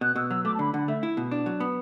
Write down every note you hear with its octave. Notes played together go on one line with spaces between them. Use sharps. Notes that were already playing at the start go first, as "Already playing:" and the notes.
B2 F#6
B2 E6
F#3 E6
A3 D6
A5
D3 B5
D3 F#5
A3 E5
E4
B2
D4
F#3
B3